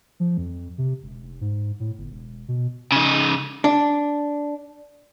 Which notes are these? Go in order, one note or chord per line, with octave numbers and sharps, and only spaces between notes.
F3
F2
C3
E1
F1
G#2
A2
G1
E1
B2
C#3 D#4
D4